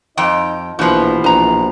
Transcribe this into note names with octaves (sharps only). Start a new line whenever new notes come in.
F2 D#4 D#5 G5
A#1 B2 E3 F3
A#1 B4 A#5